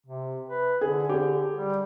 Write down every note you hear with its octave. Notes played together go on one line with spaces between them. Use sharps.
C3
B4
D3 G#4
G4 G#4
G3